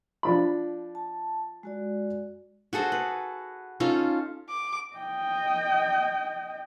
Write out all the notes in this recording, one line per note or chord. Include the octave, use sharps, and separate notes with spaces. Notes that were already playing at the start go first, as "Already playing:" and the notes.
F3 D4 B5
A5
G#3 F#4 D5
F#4 G#4 A4 C5
B4
C#4 D#4 F4 A4
D6
D#5 G5